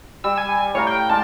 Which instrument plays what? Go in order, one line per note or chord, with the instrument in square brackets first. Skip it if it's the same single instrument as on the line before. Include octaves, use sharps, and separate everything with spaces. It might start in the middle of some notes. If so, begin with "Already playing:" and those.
[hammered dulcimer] G3 [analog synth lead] E6
[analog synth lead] G#5
[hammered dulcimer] A2 F5 A#5 [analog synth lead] C#5
[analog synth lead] G5
[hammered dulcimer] G#3 D5 F5 [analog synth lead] A5